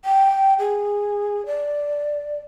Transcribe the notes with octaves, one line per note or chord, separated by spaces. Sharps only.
G5
G#4
D5